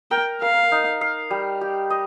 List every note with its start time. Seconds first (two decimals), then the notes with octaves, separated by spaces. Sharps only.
0.11 A#4 G5
0.41 A#4 F5
0.72 D#4
1.01 F5
1.30 G3
1.61 G4
1.90 D#5